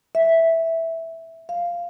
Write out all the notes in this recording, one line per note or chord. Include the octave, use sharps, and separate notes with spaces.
E5
F5